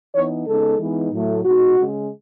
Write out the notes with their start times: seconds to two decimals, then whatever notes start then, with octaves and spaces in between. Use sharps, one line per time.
0.15 E3 B3 D#4 C#5
0.47 C#3 G#3 B3 D#4 A4
0.79 E3 G#3 B3 D#4
1.11 A2 F#3 A3
1.45 B2 G#3 D#4 F#4
1.77 C#3 G#3 C#4